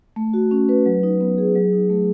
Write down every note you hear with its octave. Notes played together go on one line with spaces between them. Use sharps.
A3
F#4
C#4
B4
F#3
D#4
B3
G#4
F#3
D#4
A3